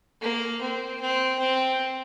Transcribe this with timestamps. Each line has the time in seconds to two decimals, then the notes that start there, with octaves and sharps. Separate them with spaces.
0.21 A#3
0.61 C4
1.01 C4
1.39 C4